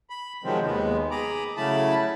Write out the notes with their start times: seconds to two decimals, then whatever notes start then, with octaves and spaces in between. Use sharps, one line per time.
0.10 B5
0.44 C3 D#3 F3 F#3 G#3 C4
0.66 D#2 G#3 B3
1.11 G#4 A#5 B5 D6
1.57 C#3 F#3 A3 E4 A5 B5